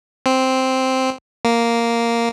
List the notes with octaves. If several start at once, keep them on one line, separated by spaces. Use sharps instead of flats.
C4
A#3